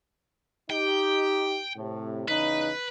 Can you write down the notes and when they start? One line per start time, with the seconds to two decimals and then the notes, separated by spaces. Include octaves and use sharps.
0.70 D#4 G4 G5
1.77 A2 C3
2.28 E2 C#3 D#4 B4